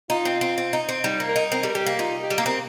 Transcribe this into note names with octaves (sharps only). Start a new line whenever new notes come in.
D#4 F4
C4
C4
C4
D#4
C4
G3 D#4
A#3
A#4
D#4
C4 A#4
G3
A#4
G3 G4
A#3
D#4 F4
G4
G3
A#3
C4 A#4